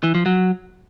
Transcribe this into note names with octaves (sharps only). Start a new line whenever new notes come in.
E3
F3
F#3